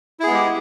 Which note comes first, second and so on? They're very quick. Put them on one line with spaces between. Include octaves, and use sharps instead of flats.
E4 G#4 B3 G#3 G4